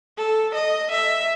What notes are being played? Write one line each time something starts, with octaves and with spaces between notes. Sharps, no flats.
A4
D#5
E5